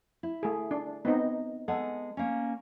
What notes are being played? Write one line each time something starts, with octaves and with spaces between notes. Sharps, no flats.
E4
A3 G#4
D4
B3 C4 D#4 D#5
G#3 B3 A4 F#5
A#3 C#4